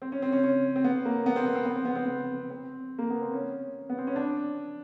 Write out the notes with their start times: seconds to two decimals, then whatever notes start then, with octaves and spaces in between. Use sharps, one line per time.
0.02 C4
0.12 C#4
0.22 C4
0.32 C#4
0.43 C#4
0.76 C4
0.84 B3
1.05 A#3
1.26 B3
1.36 C4
1.46 B3
1.55 C4
1.66 B3
1.76 C4
1.85 B3
1.95 C4
2.05 B3
2.50 C4
2.99 A#3
3.10 B3
3.22 C4
3.33 C#4
3.90 B3
3.98 C4
4.07 C#4
4.16 D4